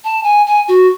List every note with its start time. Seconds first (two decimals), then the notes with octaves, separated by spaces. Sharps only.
0.04 A5
0.24 G#5
0.46 G#5
0.68 F#4